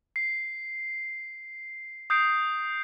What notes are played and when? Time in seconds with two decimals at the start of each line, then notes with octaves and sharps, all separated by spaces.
0.16 C7
2.10 D#6 G6 C7 D7